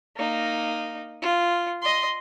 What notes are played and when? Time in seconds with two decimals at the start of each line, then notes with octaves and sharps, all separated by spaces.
0.16 A#3 D#4
1.22 F4
1.82 D#5 C6